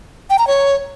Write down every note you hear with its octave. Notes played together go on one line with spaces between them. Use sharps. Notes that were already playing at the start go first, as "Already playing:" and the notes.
G5
A#5
C#5